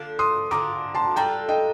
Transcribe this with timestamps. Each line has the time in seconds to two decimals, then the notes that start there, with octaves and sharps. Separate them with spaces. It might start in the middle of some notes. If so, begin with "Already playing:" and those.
Already playing: D3 F3 A#3 D4
0.19 C6 D#6
0.51 D3 F3 A#3 D4 A#5 D6
0.95 A5 C6
1.16 G3 D4 F4 A4 G5 A#5
1.49 D#5 G5